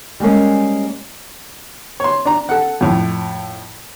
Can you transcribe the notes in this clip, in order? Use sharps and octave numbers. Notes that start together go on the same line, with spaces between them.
G3 G#3 A#3 C#4
C#5 C6
D4 A#5
A4 F#5
F2 A2